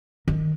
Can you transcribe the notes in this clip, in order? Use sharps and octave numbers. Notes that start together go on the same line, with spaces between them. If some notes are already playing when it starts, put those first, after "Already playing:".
D#3